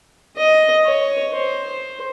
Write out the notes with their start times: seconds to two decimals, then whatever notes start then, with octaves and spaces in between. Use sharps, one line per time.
0.37 D#5
0.85 C#5
1.33 C5